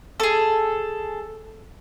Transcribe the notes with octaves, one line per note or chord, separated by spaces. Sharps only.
G#4 A4